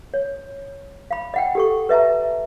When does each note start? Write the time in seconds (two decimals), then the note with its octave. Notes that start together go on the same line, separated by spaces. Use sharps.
0.14 C#5
1.11 F5 B5
1.34 D#5 F#5 G5
1.55 G4 A4 C#6
1.89 B4 D#5 E5 A5 A#5